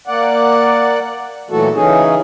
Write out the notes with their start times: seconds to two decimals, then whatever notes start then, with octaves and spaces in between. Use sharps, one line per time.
0.08 A#3 D5 F#5
1.50 A#2 E3 F#3 A3 F#4 A4
1.74 C#3 E3 C#4 D#4 G#4